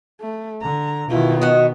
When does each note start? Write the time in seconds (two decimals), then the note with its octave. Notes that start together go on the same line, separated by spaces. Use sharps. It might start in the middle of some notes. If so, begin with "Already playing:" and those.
0.21 A3
0.62 D3 A#5
1.09 B2 D#3 E4 F4
1.41 B3 F#4 D#5